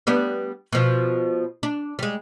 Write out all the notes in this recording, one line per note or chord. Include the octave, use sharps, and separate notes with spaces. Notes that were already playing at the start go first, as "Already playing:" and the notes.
G3 B3 D4
B2 F3
D4
G3 G#3